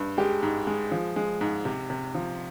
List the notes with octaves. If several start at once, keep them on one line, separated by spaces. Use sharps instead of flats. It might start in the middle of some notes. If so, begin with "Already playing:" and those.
Already playing: G2
G#3 G4
G#2
G#3
F3
G#3
G#2
C3
C3
F3